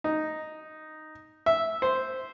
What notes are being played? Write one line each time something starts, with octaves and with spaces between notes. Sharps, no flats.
D#4
E5
C5